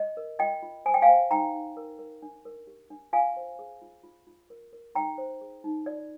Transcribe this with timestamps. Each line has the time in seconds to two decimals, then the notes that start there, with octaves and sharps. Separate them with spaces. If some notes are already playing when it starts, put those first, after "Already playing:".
Already playing: D#5
0.17 A#4
0.39 F4 D#5 G5
0.62 F4
0.85 C5 G#5
0.94 G5
1.02 F5 G#5
1.08 C5
1.30 D#4 G5 A#5
1.53 D#4
1.77 A#4
1.99 A#4
2.22 D4
2.45 A#4
2.67 G4
2.90 D4
3.13 F4 F5 G#5
3.36 C5
3.59 G#4
3.82 F4
4.04 F4
4.27 F4
4.50 A#4
4.73 A#4
4.95 D#4 G5 A#5
5.18 C5
5.41 G#4
5.64 D#4
5.86 F4 D5